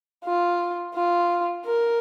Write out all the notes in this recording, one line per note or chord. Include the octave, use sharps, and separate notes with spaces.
F4
F4
A#4